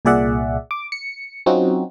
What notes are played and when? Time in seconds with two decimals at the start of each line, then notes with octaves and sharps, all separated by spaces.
0.05 C2 A#2 G#4 D5 E5 F#5
0.71 D6
0.92 C#7
1.46 F#3 C4 C#4 D#4 F4 F#4